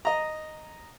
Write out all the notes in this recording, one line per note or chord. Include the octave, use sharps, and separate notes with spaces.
D#5 A#5